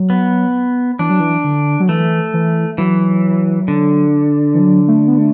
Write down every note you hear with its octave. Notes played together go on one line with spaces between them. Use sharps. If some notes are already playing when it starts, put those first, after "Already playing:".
Already playing: F#3
B3
E3 D4
F#3
E3
D3
F#3
E3 A3
E3
E3 F#3
D3
E3
F#3
A3
B3
A3